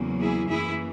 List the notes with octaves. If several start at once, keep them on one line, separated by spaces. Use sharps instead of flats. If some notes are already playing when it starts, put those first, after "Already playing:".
Already playing: E2 C#3 F#3 A#3
E4 G#4
F#2 E3 A#3 E4 G#4